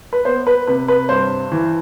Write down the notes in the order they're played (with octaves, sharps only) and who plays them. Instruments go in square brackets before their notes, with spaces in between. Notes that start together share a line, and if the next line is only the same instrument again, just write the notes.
[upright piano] B4
B3 C5
B4
C3 B4
B4
G2 C5
E3